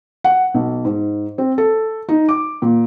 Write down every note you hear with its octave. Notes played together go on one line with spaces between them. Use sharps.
F#5
B1
G#2
C4
A4
D#4
D6
A#2